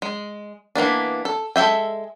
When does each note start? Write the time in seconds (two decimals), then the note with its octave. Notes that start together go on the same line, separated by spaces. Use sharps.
0.02 G#3
0.75 E3 A#3 B3 D4
1.25 A4
1.56 G#3 A4 E5 G5